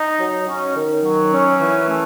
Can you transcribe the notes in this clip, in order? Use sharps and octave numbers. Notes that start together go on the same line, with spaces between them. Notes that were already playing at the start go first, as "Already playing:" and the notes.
Already playing: D#4
F#3
C#4
D#3
F#3
C#4
E3
A3